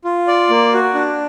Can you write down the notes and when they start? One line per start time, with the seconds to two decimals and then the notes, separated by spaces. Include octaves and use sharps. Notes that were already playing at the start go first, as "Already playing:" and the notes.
0.05 F4
0.27 D5
0.50 A#3
0.73 F#4
0.95 D4